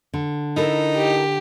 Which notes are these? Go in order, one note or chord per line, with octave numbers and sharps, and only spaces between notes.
D3
D#4 E4 A4 A#4
G4